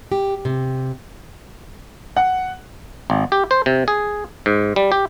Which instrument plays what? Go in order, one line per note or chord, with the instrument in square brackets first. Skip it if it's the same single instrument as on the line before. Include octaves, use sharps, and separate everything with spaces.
[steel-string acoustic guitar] G4
C3
[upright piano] F#5
[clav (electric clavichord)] G#1
G4
C5
C3
G#4
G#2
G3
G4